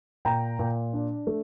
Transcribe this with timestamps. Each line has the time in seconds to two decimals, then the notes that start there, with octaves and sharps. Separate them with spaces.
0.25 A#2 G5 A#5
0.59 A#2
0.93 D4
1.27 A3